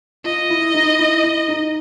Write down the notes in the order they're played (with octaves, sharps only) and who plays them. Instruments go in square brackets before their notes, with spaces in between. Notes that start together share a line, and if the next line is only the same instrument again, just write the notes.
[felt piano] F4 [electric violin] D#5
[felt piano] E4
D#4
E4
E4
D#4